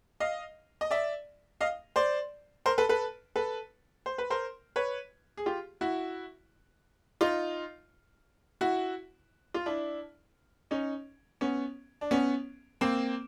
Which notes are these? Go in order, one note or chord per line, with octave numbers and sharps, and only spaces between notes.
D#5 F5
D#5
D5 E5
D#5 F5
C5 D5
A#4 C5
A4 B4
A4 B4
A4 B4
C5
B4
A#4 C5
B4 C#5
G#4
F4 G4
E4 F#4
D#4 F4
E4 F#4
F4
D4 E4
C#4 D#4
B3 C#4
D4
B3 C#4
A#3 C4